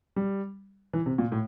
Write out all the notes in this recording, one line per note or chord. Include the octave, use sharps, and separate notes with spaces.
G3
E3
C3
A#2
A2